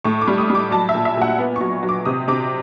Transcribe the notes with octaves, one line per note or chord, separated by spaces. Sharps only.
A2 C#6
D6
G3
D#6
G3
D6
F#3 A5
E5
A#2
E5
A#2 F#5
B3
F#3 C#6
F#3
D6
C3 D#6
C3 D6